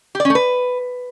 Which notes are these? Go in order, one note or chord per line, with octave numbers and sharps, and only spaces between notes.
G4
D5
C#4
A3
B4